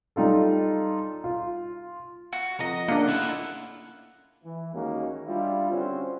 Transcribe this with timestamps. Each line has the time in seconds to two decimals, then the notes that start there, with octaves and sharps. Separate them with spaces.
0.16 G3 D#4 F4 A4
1.24 F4
2.33 F#4
2.60 F2 D#5 A#5
2.88 C#3 A#3 D4 F#5
3.08 A2 E4 F4
4.44 E3
4.74 D#2 G#3 A#3 C#4 D#4 F#4
5.27 G3 D4 E4 F4
5.71 D3 G3 C4 C#4 F#4 C5